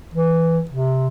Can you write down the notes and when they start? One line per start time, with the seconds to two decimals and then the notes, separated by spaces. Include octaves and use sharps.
0.14 E3
0.71 C3